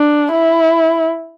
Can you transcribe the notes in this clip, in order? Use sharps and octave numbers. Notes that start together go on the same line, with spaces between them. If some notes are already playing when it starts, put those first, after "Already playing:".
Already playing: D4
E4